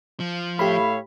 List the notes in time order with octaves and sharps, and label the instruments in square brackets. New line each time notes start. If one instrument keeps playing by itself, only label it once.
[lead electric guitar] F3
[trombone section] A2 A3 [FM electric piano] G4 B5 [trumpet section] C#5 E5 F5